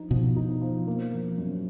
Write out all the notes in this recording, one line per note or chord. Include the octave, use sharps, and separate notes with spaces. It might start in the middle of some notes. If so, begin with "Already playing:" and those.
Already playing: F3 D#4
B2 F3
D#4
F3
A#3
F3
F#2